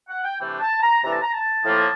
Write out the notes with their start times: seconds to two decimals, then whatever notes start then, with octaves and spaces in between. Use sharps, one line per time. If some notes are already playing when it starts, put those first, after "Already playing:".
0.08 F#5
0.24 G5
0.39 C3 E3 A3 D4 G5
0.60 A5
0.81 A#5
1.02 C3 E3 A3 D4 A#5
1.12 A5
1.22 A#5
1.33 A5
1.64 A2 F3 A#3